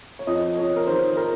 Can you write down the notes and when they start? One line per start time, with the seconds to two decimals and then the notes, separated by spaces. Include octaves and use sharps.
0.19 C#5
0.27 F2 D#5
0.57 F2 C#5
0.76 A#4
0.87 D#3 C5
1.17 A#4